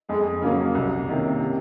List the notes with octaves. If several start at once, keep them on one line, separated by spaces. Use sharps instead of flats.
F2 G#3
C#3 F#3 A#3 C#4
C2
C3 D#3 A#3 C#4
C3